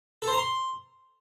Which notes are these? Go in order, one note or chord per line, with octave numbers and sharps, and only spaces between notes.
A4
C5
A#5
C6